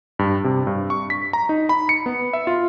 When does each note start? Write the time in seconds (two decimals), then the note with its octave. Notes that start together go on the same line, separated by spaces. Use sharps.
0.19 G2
0.44 C3
0.67 G2
0.90 C#6
1.10 B6
1.33 A#5
1.49 D#4
1.69 B5
1.89 C#7
2.06 B3
2.33 E5
2.47 F4